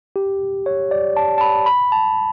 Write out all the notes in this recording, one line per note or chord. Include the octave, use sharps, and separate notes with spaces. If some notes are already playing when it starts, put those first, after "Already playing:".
G4
C#5
D5
A5
A5
B5
B5
A5